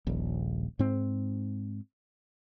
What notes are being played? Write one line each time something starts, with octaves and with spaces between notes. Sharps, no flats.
D#1 A#1
G#2 C4